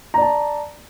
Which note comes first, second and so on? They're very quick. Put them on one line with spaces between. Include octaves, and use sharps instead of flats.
A#5 D5 A5